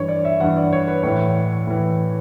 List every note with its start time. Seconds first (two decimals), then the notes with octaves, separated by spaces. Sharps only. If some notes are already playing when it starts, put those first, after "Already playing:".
Already playing: G2 E3 C#5
0.09 D5
0.25 E5
0.40 G2 E3 F#5
0.56 D5
0.73 C#5
0.88 B4
1.03 A2 E3 C#5
1.67 A2 E3